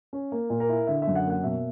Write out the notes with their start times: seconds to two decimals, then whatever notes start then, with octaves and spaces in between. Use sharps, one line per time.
0.13 C#4
0.32 A#3
0.50 A#2
0.60 A#4
0.69 E4
0.87 D3 E5
1.02 E5
1.07 F#2
1.15 F#5
1.25 A#3
1.30 F#5
1.44 B2 E5